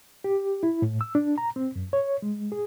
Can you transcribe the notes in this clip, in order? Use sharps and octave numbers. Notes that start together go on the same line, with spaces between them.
G4
E4
A2
E6
D4
A#5
C4
F#2
C#5
G#3
G#4